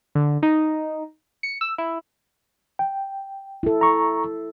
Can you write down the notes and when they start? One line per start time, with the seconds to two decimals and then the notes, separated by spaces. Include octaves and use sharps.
0.15 D3
0.43 D#4
1.43 C#7
1.61 E6
1.78 E4
2.79 G5
3.63 E4 A4
3.81 A#5 C#6